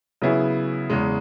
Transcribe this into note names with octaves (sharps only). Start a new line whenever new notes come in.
C#3 F#3 B3 E4 G#4
E2 C#3 G#3